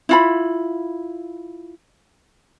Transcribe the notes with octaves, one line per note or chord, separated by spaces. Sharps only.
E4 F4 B5